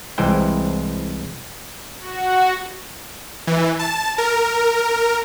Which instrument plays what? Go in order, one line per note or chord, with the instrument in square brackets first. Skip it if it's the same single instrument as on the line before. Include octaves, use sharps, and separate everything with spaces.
[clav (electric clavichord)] C2 E3 G#3 C5 G5
[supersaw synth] F#4
E3
A5
A#4